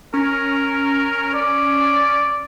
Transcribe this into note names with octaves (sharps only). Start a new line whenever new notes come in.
C#4 A#4
D5